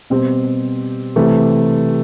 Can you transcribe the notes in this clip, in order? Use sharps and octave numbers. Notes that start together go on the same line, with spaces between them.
B2 G3 C4 G4
C3 E3 A3